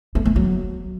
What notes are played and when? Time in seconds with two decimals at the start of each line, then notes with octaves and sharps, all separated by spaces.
0.15 A3
0.25 A3
0.36 F#3